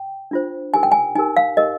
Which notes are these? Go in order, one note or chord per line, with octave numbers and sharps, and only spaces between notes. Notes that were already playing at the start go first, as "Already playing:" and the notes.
Already playing: G5
D4 F4 C5
D#4 G4 A#4 G#5
G5
G#5
D#4 G4 A#4 G#5
F5
D#4 G4 A#4 D#5